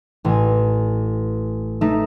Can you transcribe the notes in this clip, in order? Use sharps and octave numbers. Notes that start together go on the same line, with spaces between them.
A1 G#5
A3 D#4 E5